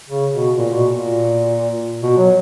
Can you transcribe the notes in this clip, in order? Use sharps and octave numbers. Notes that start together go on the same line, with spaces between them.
C#3
B2
A#2
B2
A#2
B2
F#3